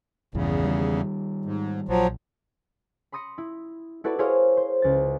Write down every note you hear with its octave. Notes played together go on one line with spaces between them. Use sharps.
A#1 E2 G2 C#3 E3
D#3 G3
G#2
A#1 F3 F#3
B5 C6 D#6 A#6 C#7
E4
E4 F#4 A4 B4 D5 B5
E4 G#4 A#4 C5 C#5 F5
C5
C#2 A6